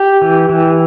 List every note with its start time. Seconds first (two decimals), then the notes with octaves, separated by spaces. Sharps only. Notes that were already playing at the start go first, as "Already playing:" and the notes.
Already playing: G4
0.22 E3
0.49 E3